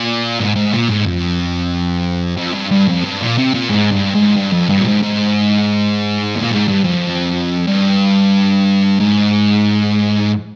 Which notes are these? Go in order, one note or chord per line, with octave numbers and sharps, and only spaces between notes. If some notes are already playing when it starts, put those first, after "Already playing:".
Already playing: A#2
G#2
G#2
A#2
G#2
F2
F2
G2
G2
F2
G2
A#2
C3
A#2
G#2
G2
G#2
G2
F2
G2
A#2
G#2
G#2
A#2
G#2
G2
F2
G2
G#2